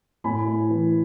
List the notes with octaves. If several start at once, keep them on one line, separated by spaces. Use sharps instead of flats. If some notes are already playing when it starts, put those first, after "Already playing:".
A2 G#5 B5
A2
E3